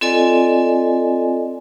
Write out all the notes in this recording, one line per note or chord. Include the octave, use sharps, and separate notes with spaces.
C4 F4 A4 D5 D#5 G#5